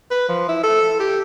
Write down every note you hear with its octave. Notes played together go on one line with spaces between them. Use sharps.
B4
F3
E4
A4
G4